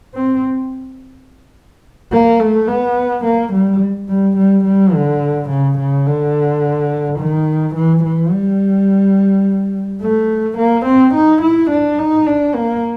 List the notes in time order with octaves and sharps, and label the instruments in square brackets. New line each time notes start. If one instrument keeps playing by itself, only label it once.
[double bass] C4
A#3
A3
B3
A#3
G3
G3
G3
G3
D3
C#3
C#3
D3
D#3
E3
E3
G3
A3
A#3
C4
D#4
E4
D4
D#4
D4
A#3